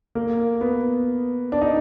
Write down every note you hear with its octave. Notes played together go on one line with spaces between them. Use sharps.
A#3
B3
D4
D#4